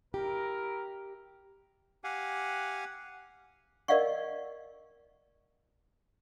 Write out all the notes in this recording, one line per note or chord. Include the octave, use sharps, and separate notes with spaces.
E4 G4 A#4
G4 F5 F#5 G#5
A#4 D5 D#5 F5 F#5 C#6